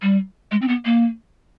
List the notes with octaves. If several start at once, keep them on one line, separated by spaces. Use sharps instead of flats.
G3
G#3
C4
B3
A#3